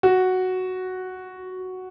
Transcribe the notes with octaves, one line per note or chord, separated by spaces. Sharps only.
F#4